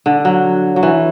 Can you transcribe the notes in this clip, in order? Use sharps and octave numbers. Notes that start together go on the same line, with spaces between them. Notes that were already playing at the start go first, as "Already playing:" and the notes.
D3
F#3
F#3
E3